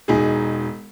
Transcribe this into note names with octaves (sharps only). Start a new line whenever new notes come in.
E1 D#4 G#4